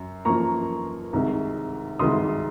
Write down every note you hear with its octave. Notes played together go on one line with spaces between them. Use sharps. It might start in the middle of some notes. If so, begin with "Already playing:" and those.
Already playing: F#2
F#2 F3 A#3 A#5 C#6
C2 C3 D#3 G#3
C2 C3 D#3 G#3 C6 D#6